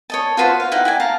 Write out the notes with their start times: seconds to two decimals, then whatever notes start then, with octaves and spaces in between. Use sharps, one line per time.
0.10 C#5 D#5 A5
0.37 F4 F#4 B4 C5
0.60 F5
0.72 D#4 E4 F#5 G5
0.85 E4 D5 G#5
1.00 F5 A5 A#5